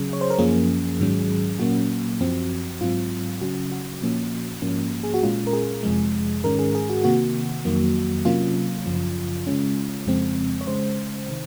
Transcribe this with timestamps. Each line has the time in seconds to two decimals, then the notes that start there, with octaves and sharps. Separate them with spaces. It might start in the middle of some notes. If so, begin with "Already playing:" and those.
Already playing: C#3 F#3 C#4 G#4
0.13 C#5
0.21 C5
0.30 A#4
0.39 F#2 F3 A#3 C#4 G#4
1.00 G#2 D#3 F#3 C#4
1.59 A#2 F#3 A#3 C#4 F#4
2.21 F#2 F3 C4
2.81 G#2 F#3 C4 F4
3.41 C#3 F#3 C#4 F#4
3.71 F#4
4.02 A#2 F3 A#3 C#4
4.62 G#2 F3 A#3 C#4
5.03 G#4
5.14 F#4
5.23 A#2 G#3 C#4 F4
5.47 A#4
5.53 G#4
5.83 F2 C3 F3 G#3
6.44 G#2 D#3 G#3 C#4 A#4
6.59 G#4
6.75 G#4
6.90 F#4
7.04 C3 D#3 A#3 F#4
7.65 F2 D#3 F#3 A#3
8.25 C3 F#3 A#3 C#4 F4
8.86 F#2 C#3 F3
9.47 C#3 G#3 C#4
10.07 F2 C#3 F3 G#3 C4
10.61 C#5
10.67 C#3 G#3 C#4 C5
11.28 C3 D#3